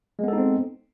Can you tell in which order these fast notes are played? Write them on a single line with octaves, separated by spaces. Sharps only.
G#3 B3 A4 D#4 C4